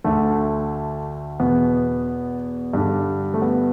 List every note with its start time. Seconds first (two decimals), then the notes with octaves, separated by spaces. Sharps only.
0.04 D2 D3 A3
1.40 E2 B2 B3
2.73 G2 D3 D4
3.34 A3
3.42 B3